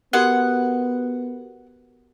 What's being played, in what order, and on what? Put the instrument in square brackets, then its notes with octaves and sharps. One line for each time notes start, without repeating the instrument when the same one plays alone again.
[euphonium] B3 [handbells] F#4 G4 A#4 [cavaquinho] F#5